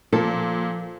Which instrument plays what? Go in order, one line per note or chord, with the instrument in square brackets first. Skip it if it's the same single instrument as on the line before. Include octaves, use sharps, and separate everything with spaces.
[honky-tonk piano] A#2 [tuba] F3 [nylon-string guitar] A4